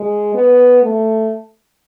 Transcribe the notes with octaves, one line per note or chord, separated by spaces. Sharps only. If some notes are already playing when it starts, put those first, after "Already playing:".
Already playing: G#3
B3
A3